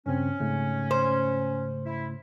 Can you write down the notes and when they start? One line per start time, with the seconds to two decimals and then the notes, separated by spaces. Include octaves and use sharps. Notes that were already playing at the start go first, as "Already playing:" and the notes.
0.06 G2 C#3 C4 C#4
0.40 G#2 C#3 A3
0.91 C5
1.85 E4